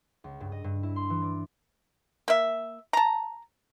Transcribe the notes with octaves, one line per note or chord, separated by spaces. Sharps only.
C#2
G2
D#5
G2
E4
C6
E3
D5
A#3 E5
A5 A#5